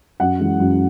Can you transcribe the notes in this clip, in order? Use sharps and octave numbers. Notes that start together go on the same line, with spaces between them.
F#2 F#5
E3 G#3
F#2